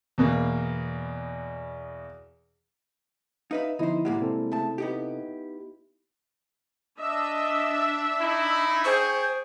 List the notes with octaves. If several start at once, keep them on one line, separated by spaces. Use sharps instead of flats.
E2 B2 A#3
D#4 B4 E5 F5
D3 F3 B3 D#4 E4 C5
A2 G3 G#3 A#3 F#5
C3 C4 A4
C#3 A3 A5
B3 D#4 G4
D4 D#5 E5
D#4 E4
G#4 C5 G5 C#6